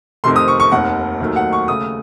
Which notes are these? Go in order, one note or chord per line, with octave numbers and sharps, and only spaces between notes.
F2 C3 D#3 A3 C6
D#6
C#6
C#6
F1 D#2 D#3 F#5
D#2 D#3 F#3 A3
F#5
C#6
D#2 C#3 A3 D#6